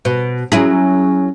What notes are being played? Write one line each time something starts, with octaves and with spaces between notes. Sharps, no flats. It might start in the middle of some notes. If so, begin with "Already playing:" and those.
B2
F#3 C#4 E4 G#4